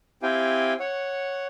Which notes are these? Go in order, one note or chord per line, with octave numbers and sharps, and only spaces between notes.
C4 E4 G4 F5 G5 G#5
C#5 F#5